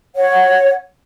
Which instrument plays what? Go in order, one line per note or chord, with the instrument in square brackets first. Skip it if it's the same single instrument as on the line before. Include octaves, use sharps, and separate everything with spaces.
[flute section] C#5 F#5